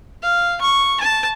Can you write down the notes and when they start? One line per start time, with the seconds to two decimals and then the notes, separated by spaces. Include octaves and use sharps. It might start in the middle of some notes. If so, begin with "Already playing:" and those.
0.23 F5
0.61 C#6
1.00 A5